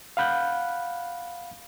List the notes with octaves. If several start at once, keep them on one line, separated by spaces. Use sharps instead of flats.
F5 F#5 B5 F#6 G6